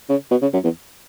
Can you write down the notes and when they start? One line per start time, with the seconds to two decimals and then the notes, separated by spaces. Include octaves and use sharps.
0.09 C#3
0.31 B2
0.42 C#3
0.53 F#2
0.64 E2